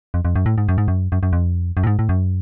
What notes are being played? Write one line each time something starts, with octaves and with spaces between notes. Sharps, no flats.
F2
F2
F#2
A2
G#2
F#2
G#2
F#2
F#2
F#2
F2
F#2
A2
G#2
A2
F#2